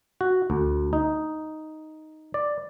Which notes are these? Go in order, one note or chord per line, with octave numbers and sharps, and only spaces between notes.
F#4
D2
D#4
D5